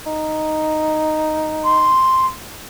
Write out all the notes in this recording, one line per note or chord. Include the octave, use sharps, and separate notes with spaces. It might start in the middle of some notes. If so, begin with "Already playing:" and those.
D#4
C6